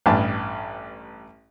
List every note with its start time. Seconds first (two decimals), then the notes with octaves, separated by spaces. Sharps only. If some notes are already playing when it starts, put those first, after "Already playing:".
0.06 A1 G2 A5 B5